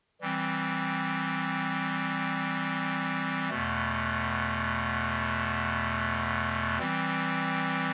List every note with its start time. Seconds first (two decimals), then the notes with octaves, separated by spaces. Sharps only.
0.21 E3 G3 C4
3.50 E2 B2 A3
6.79 E3 G3 C4